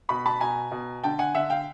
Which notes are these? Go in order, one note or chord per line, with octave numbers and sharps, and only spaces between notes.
B2 B5 C#6
A5 B5
B2 G#5 A#5
B2
D3 G5 A5
F#5 G#5
D3 E5 F#5
F5 G5